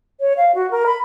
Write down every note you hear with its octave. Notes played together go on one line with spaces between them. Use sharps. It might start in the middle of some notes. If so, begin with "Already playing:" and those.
C#5
F5
F#4
A#4
B5